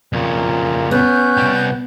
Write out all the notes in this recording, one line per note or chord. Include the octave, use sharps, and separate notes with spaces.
F2 A#2 C#3
B3 C#4 F#6 G6
C2 G3